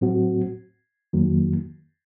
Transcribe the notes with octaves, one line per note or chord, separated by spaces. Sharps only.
A2 F#3 C4 F#4
F2 D#3 F#3 A#3